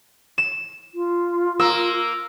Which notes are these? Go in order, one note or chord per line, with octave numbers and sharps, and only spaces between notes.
E7
F4
A#3 E6